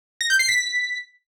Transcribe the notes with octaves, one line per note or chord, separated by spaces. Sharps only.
A#6
G6
C7
B6